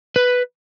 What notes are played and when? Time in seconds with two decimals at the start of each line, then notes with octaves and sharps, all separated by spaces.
0.16 B4